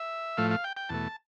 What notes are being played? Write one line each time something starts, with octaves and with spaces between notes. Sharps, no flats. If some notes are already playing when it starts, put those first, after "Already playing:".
Already playing: E5
A2 F3 A3 F5
F5
G5
G5
E2 B2 A3 A5